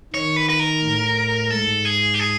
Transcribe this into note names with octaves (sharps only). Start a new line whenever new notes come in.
D#3 C#5
B4
B4
A#4
A2
G#2 A4
G#4
G4
G#4